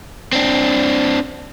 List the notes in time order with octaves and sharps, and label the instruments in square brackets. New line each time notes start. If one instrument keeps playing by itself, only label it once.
[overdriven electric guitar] C4 D4